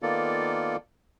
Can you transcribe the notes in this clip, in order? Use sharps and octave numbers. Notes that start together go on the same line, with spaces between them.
D#3 A#3 B3 F4 A4 D5